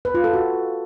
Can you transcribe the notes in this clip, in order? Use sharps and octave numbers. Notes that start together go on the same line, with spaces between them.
B4
F4
A4
F#4